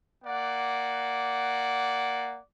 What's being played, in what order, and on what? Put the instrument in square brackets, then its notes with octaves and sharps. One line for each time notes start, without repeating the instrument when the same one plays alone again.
[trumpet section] A#3 D5 F#5